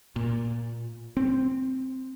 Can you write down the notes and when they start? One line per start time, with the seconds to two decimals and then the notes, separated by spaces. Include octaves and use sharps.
0.16 A#2
1.17 C4